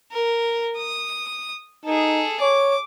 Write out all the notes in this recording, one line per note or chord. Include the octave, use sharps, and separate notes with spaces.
A#4
D#6
D#4 G#4 A4
C#5 D6